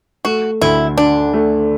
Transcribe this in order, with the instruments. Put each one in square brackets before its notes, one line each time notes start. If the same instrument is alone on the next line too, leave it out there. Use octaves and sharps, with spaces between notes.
[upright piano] A3 [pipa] F#4
[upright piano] D2 [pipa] E4
[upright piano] D3 [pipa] D4
[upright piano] A3